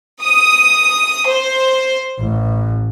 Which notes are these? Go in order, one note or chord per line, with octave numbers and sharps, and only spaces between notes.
D#6
C5
A1